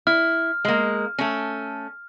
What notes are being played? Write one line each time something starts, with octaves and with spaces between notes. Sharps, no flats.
E4 F6
G#3 A#3
A3 C#4